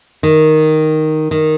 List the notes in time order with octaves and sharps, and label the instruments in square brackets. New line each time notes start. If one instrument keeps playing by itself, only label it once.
[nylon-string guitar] D#3
D#3